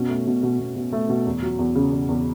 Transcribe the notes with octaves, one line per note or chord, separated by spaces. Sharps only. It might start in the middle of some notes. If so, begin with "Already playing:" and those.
Already playing: B2 C#4
A3
B2
B2
B2
B2
A3
B2
E2
F#3
E2
C#3
E2
E2